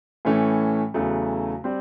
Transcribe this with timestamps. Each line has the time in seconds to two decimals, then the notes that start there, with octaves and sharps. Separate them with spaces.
0.25 A2 E3 A3 C#4
0.94 E2 C#3 F#3 A3
1.64 G3 C4